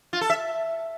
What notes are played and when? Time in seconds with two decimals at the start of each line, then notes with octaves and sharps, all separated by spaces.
0.13 F4
0.21 A4
0.30 E5